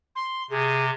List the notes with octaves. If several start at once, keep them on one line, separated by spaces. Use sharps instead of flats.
C6
C3 G#4